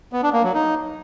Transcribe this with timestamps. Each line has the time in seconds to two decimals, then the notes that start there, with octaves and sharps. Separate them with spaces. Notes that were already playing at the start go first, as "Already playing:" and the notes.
0.13 B3
0.23 D4
0.33 A#3
0.43 F#3
0.54 D#4